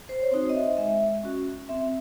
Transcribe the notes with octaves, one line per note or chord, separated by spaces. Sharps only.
C5
C#5
C4 D#4 F#4 C5
D#5
E5
G#3 E5
C#4 F#4
C4 E5